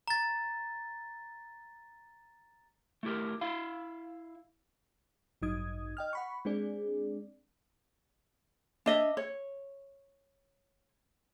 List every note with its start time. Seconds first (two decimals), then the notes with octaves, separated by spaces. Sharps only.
0.08 A#5 A6
3.03 A3 E4 G4 A#4
3.41 E4 E5 F5
5.42 A1 G2 F#3 D#4 D#6 G#6
5.97 D#5 G5 F6
6.13 F#5 B5 C#6
6.45 G#3 C4 D4 G#4 D5
8.86 D4 D#5 E5
9.17 C#5